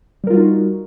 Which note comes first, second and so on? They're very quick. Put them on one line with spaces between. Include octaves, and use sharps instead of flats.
G3 A#4 F4 F#4 D#4